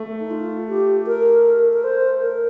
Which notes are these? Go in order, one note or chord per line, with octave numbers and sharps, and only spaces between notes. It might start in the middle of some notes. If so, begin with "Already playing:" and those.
Already playing: A3
D#4
F4
G4
A#4
A#4
C5
A#4